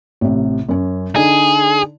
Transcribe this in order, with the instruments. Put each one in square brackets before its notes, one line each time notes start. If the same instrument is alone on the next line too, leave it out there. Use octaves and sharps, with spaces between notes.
[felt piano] A1 C3
F#2 C#4
[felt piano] D3 D#4 D5 [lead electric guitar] G#4